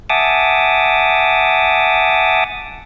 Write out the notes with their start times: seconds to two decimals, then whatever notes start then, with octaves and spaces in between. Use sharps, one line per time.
0.10 E5 F#5 G#5 A5 D6 D#6